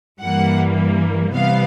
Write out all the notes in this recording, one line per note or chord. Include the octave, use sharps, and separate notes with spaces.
G2 E3 G3 A#3 F#5
C3 E3 G3 B3 F5